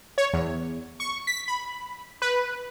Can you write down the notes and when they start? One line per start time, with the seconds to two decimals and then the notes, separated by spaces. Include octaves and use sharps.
0.18 C#5
0.33 E2
1.00 C#6
1.27 B6
1.48 B5
2.22 B4